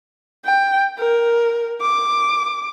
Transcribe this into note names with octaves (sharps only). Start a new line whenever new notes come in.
G5
A#4
D6